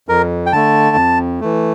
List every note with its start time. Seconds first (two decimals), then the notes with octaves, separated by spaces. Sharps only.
0.09 F2 A#4
0.46 G5
0.52 D3 A3 A5
0.96 F2
1.40 E3 A3